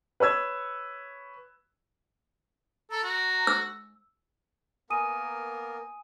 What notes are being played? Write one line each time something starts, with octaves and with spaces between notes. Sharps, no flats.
B4 C#5 E6 G#6
A4 A#5
F#4
E6
A#3 B3 A#4 G#5 D#6 D#7